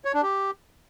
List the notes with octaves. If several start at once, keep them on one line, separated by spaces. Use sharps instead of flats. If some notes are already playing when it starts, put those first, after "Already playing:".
C#5
D4
G4